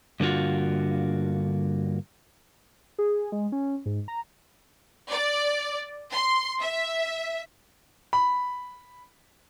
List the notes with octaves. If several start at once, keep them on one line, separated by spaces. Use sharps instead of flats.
G2 D3 A#3 B3 F4 F#4
G#4
G#3
C#4
G#2
A#5
D5
C6
E5
B5